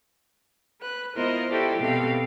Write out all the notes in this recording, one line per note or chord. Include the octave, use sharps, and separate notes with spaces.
B4 F#6
B3 E4 F4 A#4 C5 D#5
E4 F#4 G4 A4 C5 D5
B2 C4 G4 A4 F5